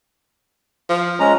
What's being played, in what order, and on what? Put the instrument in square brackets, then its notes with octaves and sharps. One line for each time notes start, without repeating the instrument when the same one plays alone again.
[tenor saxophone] F3
[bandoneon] G#3 C#4 A#5